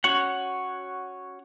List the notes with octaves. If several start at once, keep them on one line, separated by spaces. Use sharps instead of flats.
C#4 F#4 C#5 F#5